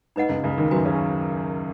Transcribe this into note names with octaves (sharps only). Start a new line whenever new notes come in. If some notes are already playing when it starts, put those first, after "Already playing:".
G#2 D#4 B4 D#5 F#5
C#2 C#3
C#2 C#3
D#2 D#3
F#2 F#3 F#4 B4 G#5
C#3 C#4